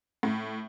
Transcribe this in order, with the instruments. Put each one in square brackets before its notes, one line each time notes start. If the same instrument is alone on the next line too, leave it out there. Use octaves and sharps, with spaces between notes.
[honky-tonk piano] A2